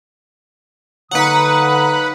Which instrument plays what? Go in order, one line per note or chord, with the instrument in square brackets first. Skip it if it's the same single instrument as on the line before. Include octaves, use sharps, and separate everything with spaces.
[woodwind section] D3 D#6 [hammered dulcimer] F#3 A#3 D#4 [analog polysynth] B4 F#5